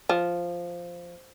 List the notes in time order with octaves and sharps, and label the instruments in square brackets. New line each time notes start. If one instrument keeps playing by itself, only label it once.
[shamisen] F3